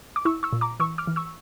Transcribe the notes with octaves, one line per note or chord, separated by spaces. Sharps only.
D6
E4 C#6 E6
C#6 E6
A#2
A#5 D6
E3 C#6 E6
D6 F6
E3
C#6 E6